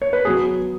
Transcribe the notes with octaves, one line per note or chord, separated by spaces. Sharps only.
C#5
B4
F#3 B3 G#4